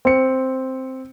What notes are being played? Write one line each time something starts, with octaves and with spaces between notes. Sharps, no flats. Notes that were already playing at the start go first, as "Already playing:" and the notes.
C4 C#7